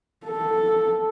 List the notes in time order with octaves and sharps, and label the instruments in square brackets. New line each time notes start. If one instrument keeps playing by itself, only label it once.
[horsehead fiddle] A4